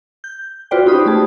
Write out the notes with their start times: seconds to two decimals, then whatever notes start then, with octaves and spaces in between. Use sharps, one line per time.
0.24 G6
0.71 F4 F#4 B4 C5 D5 G5
0.86 C#4 D#4 G4 C5 B5 D#6
1.06 A3 G4 G#4 A5